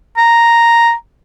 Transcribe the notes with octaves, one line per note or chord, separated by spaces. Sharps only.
A#5